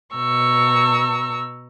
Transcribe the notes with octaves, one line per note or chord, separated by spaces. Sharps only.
B2 A#5 C#6 E6